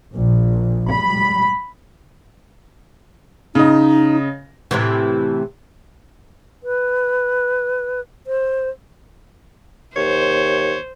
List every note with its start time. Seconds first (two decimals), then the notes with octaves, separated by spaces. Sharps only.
0.15 A#1
0.91 B5
3.55 C#3 D#4 D#5
4.71 A2 C3 E3
6.64 B4
8.27 C5
9.96 D#2 C5 C#5